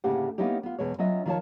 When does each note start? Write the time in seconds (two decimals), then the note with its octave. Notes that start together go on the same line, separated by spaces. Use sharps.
0.04 D2 A2 C#3 A#3 G4 F#5
0.38 A#3 B3 C#4 D#4 E4 G4
0.63 B3 F4
0.79 E2 B2 G#3 C#5
0.98 F#3 C#4 F4 D#5 E5
1.26 D#3 F3 F4 B4 C#5 A5